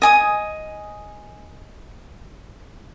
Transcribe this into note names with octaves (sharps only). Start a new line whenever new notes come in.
D#5 G#5 D#6